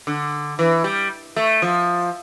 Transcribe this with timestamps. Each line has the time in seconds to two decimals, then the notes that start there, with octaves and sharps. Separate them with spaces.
0.07 D3
0.59 E3
0.84 G3
1.36 A3
1.62 F3